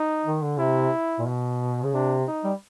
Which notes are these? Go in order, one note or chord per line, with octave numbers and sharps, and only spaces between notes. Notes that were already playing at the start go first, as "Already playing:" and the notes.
Already playing: D#4
D#3
D3
C3 E4
A#2
B2
C#3
C3 D4
D#4
G3